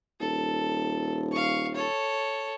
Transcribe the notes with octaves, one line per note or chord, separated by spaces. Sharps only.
D#1 A4
F5 C#6
A4 C#5